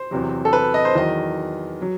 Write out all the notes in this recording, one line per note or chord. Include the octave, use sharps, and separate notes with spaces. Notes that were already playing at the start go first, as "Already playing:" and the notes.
Already playing: C5
E2 C3 F#3
A4
B4
D#5
C5
E2 D#3 F#3 D#5
F#3